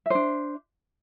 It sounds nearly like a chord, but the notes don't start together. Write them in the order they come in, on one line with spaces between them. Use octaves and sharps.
E5 C5 D4